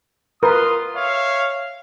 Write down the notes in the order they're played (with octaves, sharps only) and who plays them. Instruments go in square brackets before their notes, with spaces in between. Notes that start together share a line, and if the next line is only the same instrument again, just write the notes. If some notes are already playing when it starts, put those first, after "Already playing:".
[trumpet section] F4 C6 D#6 [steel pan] A#4 B4
[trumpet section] C#5 E5 F5